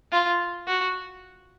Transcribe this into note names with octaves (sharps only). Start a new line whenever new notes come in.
F4
F#4